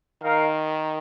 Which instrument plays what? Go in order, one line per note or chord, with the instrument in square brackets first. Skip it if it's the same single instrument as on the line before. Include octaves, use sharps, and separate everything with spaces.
[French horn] D#3 [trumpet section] D#4 A#4 F5